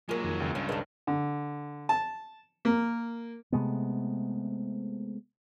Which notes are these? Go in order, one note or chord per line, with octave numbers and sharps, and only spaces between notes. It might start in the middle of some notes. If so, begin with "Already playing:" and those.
F#3 G#3 A#3 F4
F2 D#3
C#2
G2 C#4
D#3 G3 G#4 A#4 B4
D3
A5
A#3
C3 G#3 A3 B3